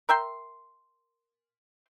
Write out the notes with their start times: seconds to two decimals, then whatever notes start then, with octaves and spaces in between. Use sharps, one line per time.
0.09 A#4 E5 G5 C6